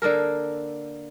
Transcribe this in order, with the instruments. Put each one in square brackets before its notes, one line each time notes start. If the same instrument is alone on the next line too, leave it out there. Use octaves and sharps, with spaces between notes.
[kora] D3 A#3 A4 A#4